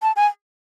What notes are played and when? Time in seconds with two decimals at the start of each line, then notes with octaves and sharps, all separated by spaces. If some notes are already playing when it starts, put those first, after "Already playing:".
0.03 A5
0.16 G#5